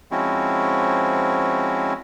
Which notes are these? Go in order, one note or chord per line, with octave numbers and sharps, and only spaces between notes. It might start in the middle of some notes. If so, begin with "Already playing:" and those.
F3 G#3 C4 C#4 E4 F#4